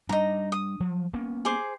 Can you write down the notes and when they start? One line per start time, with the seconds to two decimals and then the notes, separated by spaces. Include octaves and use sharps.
0.09 G3 D4 D#4 A#5
0.52 D#6
0.80 F3 F#3
1.14 A#3 B3 C#4
1.45 G#4 C5 D6